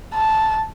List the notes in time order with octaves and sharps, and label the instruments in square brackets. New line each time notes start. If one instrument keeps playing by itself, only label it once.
[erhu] A5